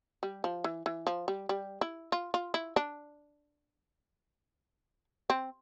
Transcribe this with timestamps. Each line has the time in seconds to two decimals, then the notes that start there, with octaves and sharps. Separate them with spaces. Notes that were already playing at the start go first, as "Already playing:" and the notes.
0.23 G3
0.44 F3
0.64 E3
0.86 E3
1.07 F3
1.28 G3
1.49 G3
1.81 E4
2.12 F4
2.34 F4
2.54 E4
2.76 D4
5.30 C4